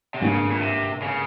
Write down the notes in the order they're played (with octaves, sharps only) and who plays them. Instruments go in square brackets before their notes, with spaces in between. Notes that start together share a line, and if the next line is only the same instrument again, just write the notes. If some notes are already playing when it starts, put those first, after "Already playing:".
[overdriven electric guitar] C3
[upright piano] G#1 G2 G3 A#3 [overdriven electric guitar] C#3
[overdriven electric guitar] A#2
C3
C#3